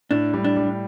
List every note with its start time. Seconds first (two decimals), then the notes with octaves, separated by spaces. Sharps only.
0.11 A2 D4
0.34 G3
0.44 D4
0.56 G3